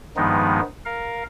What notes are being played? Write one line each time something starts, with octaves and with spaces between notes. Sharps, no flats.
G2 D#3 F3 G#3 B3 D#4
A#4 F5